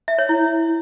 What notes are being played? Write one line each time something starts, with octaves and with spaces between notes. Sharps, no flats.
E5
C#5
E4